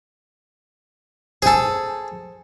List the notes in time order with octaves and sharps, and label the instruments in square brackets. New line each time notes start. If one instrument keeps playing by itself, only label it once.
[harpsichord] G#4 A4 [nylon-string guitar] C5 G#5